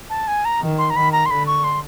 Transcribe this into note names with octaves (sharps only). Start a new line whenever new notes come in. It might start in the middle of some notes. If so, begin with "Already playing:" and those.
A5
G#5
A#5
D#3
C6
A#5
D#3 B5
A#5
C6
D3 B5
C#6
C6